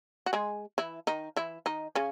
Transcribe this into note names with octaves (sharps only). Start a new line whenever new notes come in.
F#4
G#3 G#4
E3 E4
D#3 D#4
E3 E4
D#3 D#4
C#3 C#4